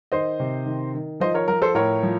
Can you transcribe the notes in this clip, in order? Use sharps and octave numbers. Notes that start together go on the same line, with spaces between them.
D#3 C5 D#5
C3
D#3
D#3
F3 C5 D#5
A#4 C#5
F3 A#4
A4 C5
A2 A#4 C#5
F3